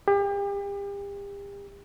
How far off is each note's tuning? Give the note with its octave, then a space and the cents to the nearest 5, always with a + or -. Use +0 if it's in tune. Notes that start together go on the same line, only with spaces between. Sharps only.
G4 +40